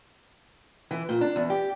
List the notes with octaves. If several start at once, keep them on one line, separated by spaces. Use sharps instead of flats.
E3
A#2
D4
E2
G4